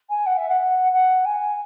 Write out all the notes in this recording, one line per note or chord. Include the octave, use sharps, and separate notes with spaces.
G#5
F#5
E5
F#5
F#5
G#5